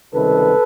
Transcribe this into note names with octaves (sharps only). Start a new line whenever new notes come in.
C#2 C3 D#3 G3 A4 B4